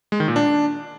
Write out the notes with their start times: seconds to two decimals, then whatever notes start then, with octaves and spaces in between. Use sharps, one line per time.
0.12 G#3
0.20 D#3
0.28 A#2
0.36 D4